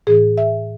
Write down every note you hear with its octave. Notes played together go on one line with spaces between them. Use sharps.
A2 E3 G#4
E5